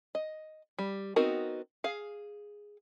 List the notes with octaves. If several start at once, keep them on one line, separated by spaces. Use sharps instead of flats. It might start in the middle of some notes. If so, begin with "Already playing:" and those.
D#5
G3
B3 C4 D#4 F#4 A#4
G#4 F5